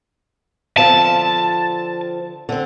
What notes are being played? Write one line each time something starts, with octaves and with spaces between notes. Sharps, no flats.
D3 F3 C4 A5
D3 C4